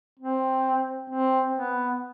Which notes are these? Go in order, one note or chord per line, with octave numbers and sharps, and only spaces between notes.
C4
C4
B3